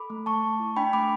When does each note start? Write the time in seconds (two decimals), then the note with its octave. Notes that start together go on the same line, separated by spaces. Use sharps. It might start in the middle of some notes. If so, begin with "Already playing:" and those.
Already playing: A4 B5 D6
0.10 A3
0.26 A3 A5 C#6
0.43 A3
0.60 E4
0.76 D4 G5 B5
0.93 A3 B5 D6